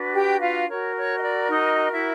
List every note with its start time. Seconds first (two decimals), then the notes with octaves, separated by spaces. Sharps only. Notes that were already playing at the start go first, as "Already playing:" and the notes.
Already playing: D4 F#4 B4
0.13 G4 G5
0.40 F4 F5
0.69 F#4 A#4 C#5
0.96 C#5
1.19 D#5
1.24 D5
1.51 D#4 D#5
1.92 E4 E5